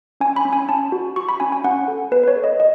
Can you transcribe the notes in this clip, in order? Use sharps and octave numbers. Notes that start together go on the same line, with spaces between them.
C#4 G#5
B5
C#4
G#5
C#4 A5
F#4
F#4 C#6
B5
C#4 G#5
G#5
C#4 F#5
A4
B3 B4
B4
C#5
A4
D#5
D#5